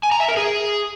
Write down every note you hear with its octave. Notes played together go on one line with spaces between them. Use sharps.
G#5
A#5
E5
A#4
G#4